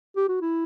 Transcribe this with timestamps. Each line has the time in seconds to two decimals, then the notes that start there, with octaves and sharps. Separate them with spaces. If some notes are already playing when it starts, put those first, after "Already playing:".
0.16 G4
0.29 F#4
0.41 E4